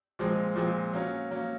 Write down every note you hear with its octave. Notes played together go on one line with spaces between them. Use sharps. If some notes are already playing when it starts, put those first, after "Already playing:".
A#2 F3 G#3 C4
A#2 F3 G#3 C4
F#3 A#3 C#4
F#3 A#3 C#4